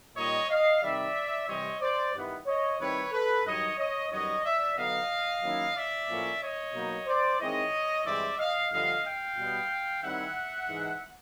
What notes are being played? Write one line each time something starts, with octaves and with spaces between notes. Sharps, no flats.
A#2 G3 A#3 D#4 C#5 D#5
D#5 F5
C3 D#3 G3 D5 E5
C3 E3 G3 C4 C#5 D#5
C5 D5
G2 D#3 G3 B3 E4
C#5 D#5
D#3 G3 C4 E4 B4 C#5
A4 B4
G2 D#3 F#3 C#5 D#5
C#5 D#5
F#2 D#3 G3 B3 C#5 D#5
D5 E5
D3 F#3 B3 D#4 D#5 F5
D#3 F#3 A#3 C#4 E4
D5 E5
A2 F3 A#3 C#4
C#5 D#5
B2 F#3 A#3 D#4
C5 D5
D#3 G#3 C4 E4 C#5 D#5
G2 E3 G#3 C4 D5 E5
D#5 F5
G2 D3 F3 D#5 F5
F5 G5
B2 G3 B3
D#3 G3 C4 E4 E5 F#5
G#2 E3 G#3